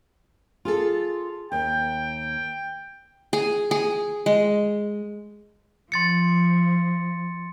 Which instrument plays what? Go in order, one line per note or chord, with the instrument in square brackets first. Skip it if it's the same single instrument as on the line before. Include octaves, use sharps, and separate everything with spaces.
[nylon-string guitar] F4 G#4 A4
[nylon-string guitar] D#2 [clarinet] G5
[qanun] G#4
G#4
G#3
[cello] F3 [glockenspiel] C6 A6 C#7